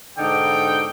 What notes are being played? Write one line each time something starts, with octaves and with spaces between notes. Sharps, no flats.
G#2 B2 D3 D#4 G5